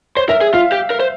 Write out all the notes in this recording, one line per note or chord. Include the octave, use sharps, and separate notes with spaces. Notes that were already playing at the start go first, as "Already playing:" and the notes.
C5 C#5
A#4 E5
G#4
F4 F5
G4
A#4
C5